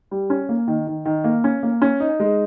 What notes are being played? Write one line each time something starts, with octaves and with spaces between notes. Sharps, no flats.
G3
C#4
A#3
D#3
D#3
D#3
A#3
C#4
A#3
C#4
D#4
G#3